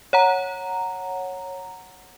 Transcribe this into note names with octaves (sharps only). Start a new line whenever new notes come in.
C#5 F#5 A#5